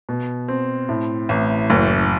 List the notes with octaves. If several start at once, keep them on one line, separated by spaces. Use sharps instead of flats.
B2
C4
A2
A1
F#1